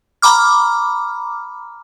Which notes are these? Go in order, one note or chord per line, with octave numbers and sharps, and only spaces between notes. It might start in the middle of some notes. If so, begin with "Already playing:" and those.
A#5 B5 D6 F6